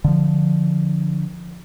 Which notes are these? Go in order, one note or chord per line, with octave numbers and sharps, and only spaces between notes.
D3 F3